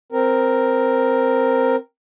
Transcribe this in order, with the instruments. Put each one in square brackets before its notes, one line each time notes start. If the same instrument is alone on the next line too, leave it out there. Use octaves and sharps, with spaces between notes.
[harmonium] C4 A#4